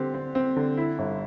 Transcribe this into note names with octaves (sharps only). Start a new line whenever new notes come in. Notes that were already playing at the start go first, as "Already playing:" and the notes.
Already playing: D3 C4 G4
C4
C4
D3
E4
G1